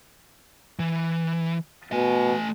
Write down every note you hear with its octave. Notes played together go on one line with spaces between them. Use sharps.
E3
B2 A3 G#5